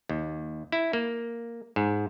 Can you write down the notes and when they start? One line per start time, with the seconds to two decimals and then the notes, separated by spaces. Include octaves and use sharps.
0.09 D#2
0.72 E4
0.93 A#3
1.76 G#2